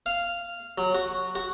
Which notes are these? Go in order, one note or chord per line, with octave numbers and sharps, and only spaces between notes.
F5
F#3
F#4
F#4